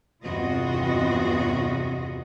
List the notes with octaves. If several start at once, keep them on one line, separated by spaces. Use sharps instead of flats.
E2 G2 C3 F4 F#4 D#5